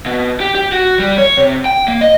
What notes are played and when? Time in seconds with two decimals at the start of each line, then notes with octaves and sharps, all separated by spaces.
0.06 B2
0.40 G4
0.55 G4
0.72 F#4
0.99 G3
1.18 C#5
1.37 C3
1.65 G5
1.88 A#3
2.01 D#5